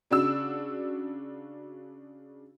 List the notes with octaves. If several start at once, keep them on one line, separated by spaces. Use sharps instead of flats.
C#3 D4 F#4 E6